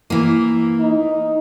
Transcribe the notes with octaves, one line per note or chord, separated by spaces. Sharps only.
E3 A#3
D#4